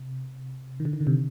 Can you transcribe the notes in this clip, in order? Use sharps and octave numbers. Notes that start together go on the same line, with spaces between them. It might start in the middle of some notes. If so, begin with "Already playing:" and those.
Already playing: C3
D#3
D3
D#3
D3
C3